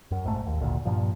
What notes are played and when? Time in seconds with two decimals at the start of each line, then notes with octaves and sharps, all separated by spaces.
0.11 F#2
0.24 A#1 G#2 D#3 A3
0.47 D#2
0.60 G#1 D2 A#2
0.85 G2 A#2 F3